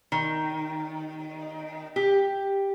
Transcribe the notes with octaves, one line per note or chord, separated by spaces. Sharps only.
D#3
G4